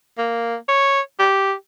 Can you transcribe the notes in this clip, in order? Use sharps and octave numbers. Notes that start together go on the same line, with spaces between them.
A#3
C#5
G4